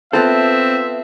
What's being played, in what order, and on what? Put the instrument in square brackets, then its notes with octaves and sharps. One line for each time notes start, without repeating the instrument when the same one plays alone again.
[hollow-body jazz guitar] B3 F4 A4 [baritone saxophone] C4 [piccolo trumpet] E5